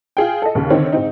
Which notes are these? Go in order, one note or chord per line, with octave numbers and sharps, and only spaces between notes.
F4 G#4 G5
A4 D#5
D#2 C#3
D3 D#3 C4 C#5
G#2 C4 D#4